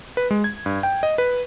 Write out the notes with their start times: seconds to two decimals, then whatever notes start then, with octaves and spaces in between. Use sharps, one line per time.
0.17 B4
0.31 G#3
0.44 G#6
0.66 G2
0.83 G5
1.03 D#5
1.18 B4